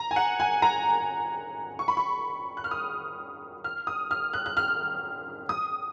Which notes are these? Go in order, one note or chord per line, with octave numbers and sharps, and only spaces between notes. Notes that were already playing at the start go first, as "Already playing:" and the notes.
Already playing: A#5
G#5
F#5
G#5
A#5
C#6
B5
C#6
F#6
F6
D#6
F6
D#6
F6
F#6
F#6
F6
D#6